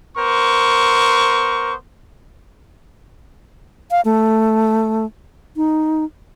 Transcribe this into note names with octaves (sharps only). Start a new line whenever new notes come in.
B3 A#4 C5 C#6
F5
A3
D#4